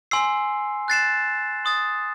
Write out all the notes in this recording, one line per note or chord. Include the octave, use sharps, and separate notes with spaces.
G#5 C6 E6 C7
F#6 A6 C7 E7
C6 D#6 A6